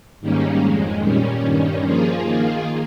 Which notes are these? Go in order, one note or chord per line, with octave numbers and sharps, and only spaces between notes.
G#2 D#3 G3 A#3 C#4
F2 D#3 G#3
A#2 G3 C#4
G2 D#3 G3 C#4
F3 A#3 F4 G#4
D#3 A#3 F4 G#4